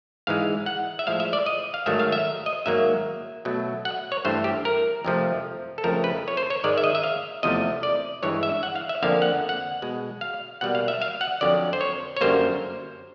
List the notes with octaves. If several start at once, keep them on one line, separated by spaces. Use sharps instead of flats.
G#2 E3 G#3 F5
F#5
E5
A2 F3 G#3 F5
E5
D5
D#5
F5
G#2 D#3 F#3 A3 E5
F5
E5
D#5
G#2 D#3 F#3 A#3 E5
B2 F#3 A3
F#5
C#5
G2 E3 A3 C5
G4
A#4
F2 C3 F3 A3
A4
F2 C#3 F3 A3 A#4
B4
C#5
C5
C#5
G#2 D#3 G#3 D5
E5
D#5
E5
F5
E2 C3 F3 A3 D#5
D5
G2 E3 G#3 C#5
E5
F#5
F5
E5
F2 D3 F3 A#3 F5
F#5
F#5
B2 G#3
F5
B2 G3 A#3 F#5
F5
E5
F5
F#5
F2 D3 F#3 D5
C5
C#5
C#5
F#2 D3 G3 A#3 C5